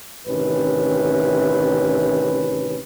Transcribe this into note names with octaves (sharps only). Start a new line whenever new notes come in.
A1 C3 D#3 C#4 B4